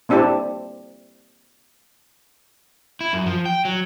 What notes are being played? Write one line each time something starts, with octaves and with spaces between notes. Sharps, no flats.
A#3 C4 D4 E4 G4 A5
E4
F#2
F3
G5
F#3